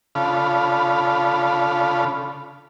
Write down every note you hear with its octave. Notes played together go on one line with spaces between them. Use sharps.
C#3 D4 F4 A4 F5 B5